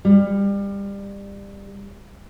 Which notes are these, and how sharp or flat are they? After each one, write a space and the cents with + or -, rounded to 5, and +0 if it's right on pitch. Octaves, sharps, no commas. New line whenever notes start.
G3 +25